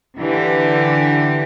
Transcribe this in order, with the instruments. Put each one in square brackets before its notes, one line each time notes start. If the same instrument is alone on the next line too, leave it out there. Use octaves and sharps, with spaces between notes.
[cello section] D3 E3 G4